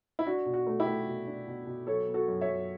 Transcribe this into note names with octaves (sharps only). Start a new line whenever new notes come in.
E4
D4 F#4
B2
F#4
A3
E4 G4
A3
B2
D4
B2
B2
F#3 A4 C#5
B3
F#4 A4
F#2
C#5 E5
F#2